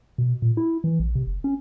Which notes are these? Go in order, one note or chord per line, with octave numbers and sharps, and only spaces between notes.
B2
A#2
E4
E3
A#1
C3
F#1
C#4